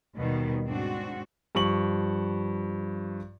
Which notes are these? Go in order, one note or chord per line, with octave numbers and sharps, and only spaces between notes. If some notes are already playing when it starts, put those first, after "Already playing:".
D#2 B2 D#3 G3
G#2 C4 D4 F#4
G2 F3 C#6 F#7